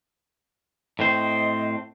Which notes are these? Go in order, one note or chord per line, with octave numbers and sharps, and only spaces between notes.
A2 C4 C5 D#5